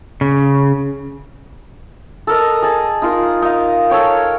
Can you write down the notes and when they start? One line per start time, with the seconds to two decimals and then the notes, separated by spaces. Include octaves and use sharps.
0.21 C#3
2.27 A4 A#4 D#5
2.62 G#4 A5
3.02 D#4 F4 A#4
3.42 D#4 F5
3.90 A4 A#4 C#5 G5